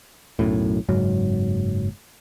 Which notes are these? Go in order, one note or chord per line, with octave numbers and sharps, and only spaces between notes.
B1 F#2 A2
F#1 G#2 F#3